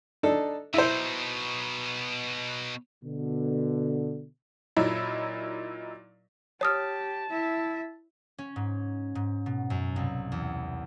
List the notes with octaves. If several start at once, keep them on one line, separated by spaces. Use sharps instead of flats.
D4 D#4 A4
B2 D#4 E4 C5
B2 D3
A#2 F#3 D#4 E4
G4 C#5 A5 D#6 F6
E4 E5
C#4
G#2
G#2
B2
F#2
C2
E2